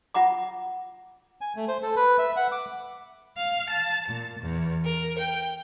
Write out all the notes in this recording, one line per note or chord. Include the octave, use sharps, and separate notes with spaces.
F4 F#5 A#5 D6
G#5
A3
C5
A4
B4
E5
F#5
D6
F5
A5
A#2
E2
A#4
G5